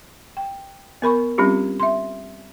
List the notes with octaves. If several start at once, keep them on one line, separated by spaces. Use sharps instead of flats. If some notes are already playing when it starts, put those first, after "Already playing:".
G5
B3 A#4 B5 C#6
G3 C4 C#4 F4 G4
E5 C6